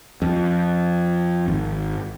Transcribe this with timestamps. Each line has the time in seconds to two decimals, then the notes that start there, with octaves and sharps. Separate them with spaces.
0.22 F2
1.48 G#1